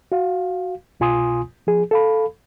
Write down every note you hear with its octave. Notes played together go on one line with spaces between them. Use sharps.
F#4 F5
C2 B2 F4 G#5 C6 D#6
F3 G#4
A4 F5 B5